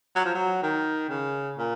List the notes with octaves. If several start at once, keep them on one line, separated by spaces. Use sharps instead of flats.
F#3
F3
F#3
D#3
C#3
A#2